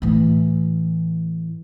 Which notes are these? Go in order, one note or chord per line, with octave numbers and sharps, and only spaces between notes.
A2 E3